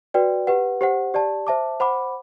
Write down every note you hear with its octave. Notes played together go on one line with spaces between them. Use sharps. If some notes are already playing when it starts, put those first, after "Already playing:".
F#4 B4 D5 G5
G4 B4 F#5
G4 C5 F#5
G4 D5 A5
C5 E5 A5 D6
C5 F#5 B5 D6